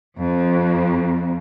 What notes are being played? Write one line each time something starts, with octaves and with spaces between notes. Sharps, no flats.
F2